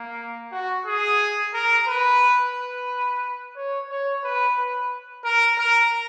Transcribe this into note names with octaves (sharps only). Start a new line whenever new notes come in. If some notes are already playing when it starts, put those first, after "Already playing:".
Already playing: A#3
F#4
G#4
A#4
B4
B4
C#5
C#5
B4
B4
A#4
A#4